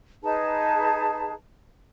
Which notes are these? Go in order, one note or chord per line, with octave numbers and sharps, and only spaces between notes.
D#4 G#4 B4 A5